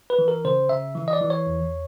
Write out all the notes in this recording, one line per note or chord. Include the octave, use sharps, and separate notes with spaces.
B4
E3
A#4
C#3 C5
C#3 E5
E3
D#5
D5
E3
C#5
E2